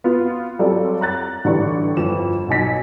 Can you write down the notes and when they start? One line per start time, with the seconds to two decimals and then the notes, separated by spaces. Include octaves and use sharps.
0.04 B3 F4
0.59 F#3 G3 C4 F4 A4 D5
1.01 A#5 F#6 A6
1.44 A1 D3 E3 G3 D5 C#6
1.97 G1 F2 E7
2.48 B1 D#4 G#5 B6